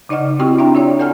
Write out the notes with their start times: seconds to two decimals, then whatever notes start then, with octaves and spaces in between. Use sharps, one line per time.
0.09 C#3 D#4 D5 D#5 F#5 F6
0.40 C4 E4 F#4 G4 G5 C#6
0.59 D4 E5 G5 A#5
0.75 F4 C#5 D5 E5
0.99 A4 D5 F#5 G#5 A#5 F6